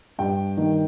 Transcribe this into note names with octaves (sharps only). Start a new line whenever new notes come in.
G2 G5
D#3